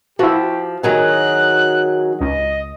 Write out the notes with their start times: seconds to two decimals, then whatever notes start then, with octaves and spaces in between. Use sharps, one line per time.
0.19 F3 E4 F#4 G4
0.83 D#3 F#3 G#4 F#6
2.21 C#2 D#5